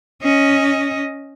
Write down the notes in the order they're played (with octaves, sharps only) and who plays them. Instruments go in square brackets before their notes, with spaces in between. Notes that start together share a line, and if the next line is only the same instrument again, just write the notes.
[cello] C#4 D#5